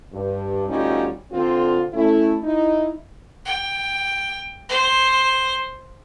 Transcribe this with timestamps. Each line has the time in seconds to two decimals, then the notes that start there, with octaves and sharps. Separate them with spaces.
0.13 G2
0.68 D2 G3 C#4 D#4 F4 F#4
1.32 D3 C4 F4
1.93 A3 C#4 E4
2.43 D#4 E4
3.45 G5
4.69 C5